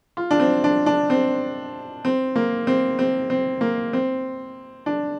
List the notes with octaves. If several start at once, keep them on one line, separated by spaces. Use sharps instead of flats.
F4
D4
C4
D4
D4
C4
C4
A#3
C4
C4
C4
A#3
C4
D4